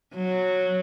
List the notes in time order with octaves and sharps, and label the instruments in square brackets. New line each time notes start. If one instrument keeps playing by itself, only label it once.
[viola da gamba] F#3